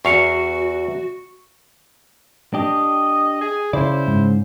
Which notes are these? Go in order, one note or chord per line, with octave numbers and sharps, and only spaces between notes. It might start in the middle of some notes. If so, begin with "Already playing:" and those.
E2 F#4 F5 C#6 C#7
D4 G4 D#5
G#4
C#3 E4 C5 D5
G#2